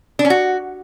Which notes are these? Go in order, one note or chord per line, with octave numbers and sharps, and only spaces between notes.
D4
C#4
F#4